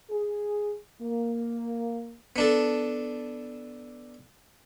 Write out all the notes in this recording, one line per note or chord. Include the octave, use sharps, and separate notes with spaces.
G#4
A#3
B3 D4 A4